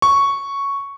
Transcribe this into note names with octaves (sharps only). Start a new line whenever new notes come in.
C#6